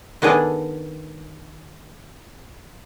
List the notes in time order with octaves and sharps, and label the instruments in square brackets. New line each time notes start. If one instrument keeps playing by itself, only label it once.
[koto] D#3 B3 D4 G#4 A4